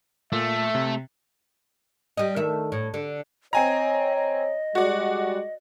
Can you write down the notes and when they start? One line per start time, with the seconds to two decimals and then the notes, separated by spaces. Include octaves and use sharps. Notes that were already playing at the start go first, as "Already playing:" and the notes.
0.32 A#2 A3 E5
0.75 C3
2.17 G3 D#5
2.36 D#3 A3 E5
2.72 A2
2.94 D3
3.53 C4 C#5 D#5 G#5 A#5
4.16 D#5
4.75 G3 G#3 F#4 D5